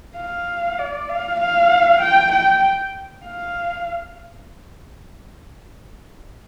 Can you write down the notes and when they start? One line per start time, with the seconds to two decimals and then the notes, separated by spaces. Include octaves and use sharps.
0.17 F5
0.78 D5
1.09 F5
1.40 F5
2.01 G5
2.32 G5
3.25 F5